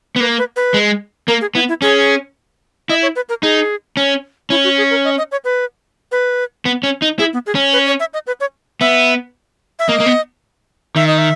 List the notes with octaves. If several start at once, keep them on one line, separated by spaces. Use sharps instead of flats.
B3
A#3 B4
B4
B4
G#3
A#3 A#4
G#4
B3 E4
E4
C#4 G#4
E4 D#5
C#5
B4
A#4
D#4 G#4
C#4
C#4 E4
F#4
G#4
A#4
D#5
D#5
C#5
B4
B4
B3
C#4
D#4
E4 G#4
B3
G#4
C#4
B4
C#5
E5
D#5
B4
C#5
B3 E5
E5
A#3 D#5
A#3
B3
D#3 E5
D#5
E5